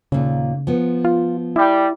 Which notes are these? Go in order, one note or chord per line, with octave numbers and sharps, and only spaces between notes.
D#2 A#2 C#3
F3 B3
F4
G3 E4